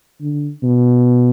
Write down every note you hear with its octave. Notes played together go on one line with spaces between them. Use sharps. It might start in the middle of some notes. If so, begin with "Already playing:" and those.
D3
B2